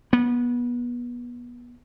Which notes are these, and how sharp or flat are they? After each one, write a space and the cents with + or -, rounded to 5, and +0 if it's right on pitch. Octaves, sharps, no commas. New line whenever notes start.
B3 -25